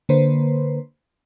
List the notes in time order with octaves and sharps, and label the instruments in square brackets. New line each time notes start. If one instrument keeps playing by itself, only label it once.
[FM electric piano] D3 A#3 B4 C5